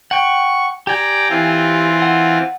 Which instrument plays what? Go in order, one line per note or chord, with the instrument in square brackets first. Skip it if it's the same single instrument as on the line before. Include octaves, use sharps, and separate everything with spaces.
[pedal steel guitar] F#5 G5 [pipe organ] C#6
[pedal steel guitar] G4 G#5 G6 [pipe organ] D5 G5 A#5
[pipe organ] E3 C4 F4
[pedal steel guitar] F#5